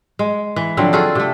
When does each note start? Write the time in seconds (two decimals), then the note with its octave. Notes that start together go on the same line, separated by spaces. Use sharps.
0.19 G#3
0.56 E3
0.77 D3 F3 F#3 C4
0.93 F4 F#4 G#4 A4
1.15 C3 A3